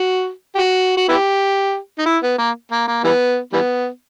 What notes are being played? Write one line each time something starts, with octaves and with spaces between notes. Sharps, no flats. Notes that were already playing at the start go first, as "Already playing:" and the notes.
Already playing: F#4
G4
F#4
F#4
B3 E4 G4
D#4
E4
B3
A#3
A#3
A#3
E3 G3 B3
E3 G3 B3